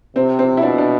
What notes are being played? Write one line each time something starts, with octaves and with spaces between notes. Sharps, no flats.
C3 C4
C4
E4
B2 D4
D4